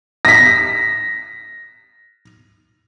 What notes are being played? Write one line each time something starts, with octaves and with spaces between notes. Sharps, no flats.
A#6 B6